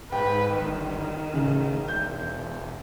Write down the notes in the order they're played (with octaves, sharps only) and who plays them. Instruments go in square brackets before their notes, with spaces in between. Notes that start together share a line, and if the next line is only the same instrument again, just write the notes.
[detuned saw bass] G#2 [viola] B4 [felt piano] G5
[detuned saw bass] G1 [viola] D#3
[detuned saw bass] A1 [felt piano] C#3
[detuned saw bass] E1 [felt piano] G6